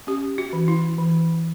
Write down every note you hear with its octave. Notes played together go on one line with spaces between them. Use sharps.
C#4 G4
F#4
E3
E4
E3